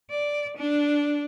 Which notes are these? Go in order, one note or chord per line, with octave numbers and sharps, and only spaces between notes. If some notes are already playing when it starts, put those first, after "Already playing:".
D5
D4